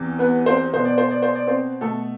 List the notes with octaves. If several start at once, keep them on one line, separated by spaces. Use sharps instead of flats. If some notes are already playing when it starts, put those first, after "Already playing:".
Already playing: E2 C3 E3
B3 B4
C4 C5
B2 B3 C5
D5
C5
D5
C5
D5
C4 C5
B2 A3 A4